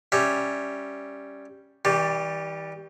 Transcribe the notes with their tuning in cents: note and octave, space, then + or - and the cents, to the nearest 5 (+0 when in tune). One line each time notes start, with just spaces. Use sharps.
G3 +0 C#4 +0 E5 -5
E3 -45 G3 +0